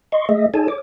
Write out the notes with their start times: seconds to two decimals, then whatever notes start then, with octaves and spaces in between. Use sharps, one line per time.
0.12 D#5 C6 C#6
0.29 A3 G#4 D#5 E5
0.54 D#4 G#4 A4 C#5 G#5 A5
0.68 C#5 D6